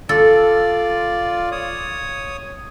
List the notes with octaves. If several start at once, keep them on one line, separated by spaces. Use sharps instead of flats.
F4 A4 D5
C#5 D#6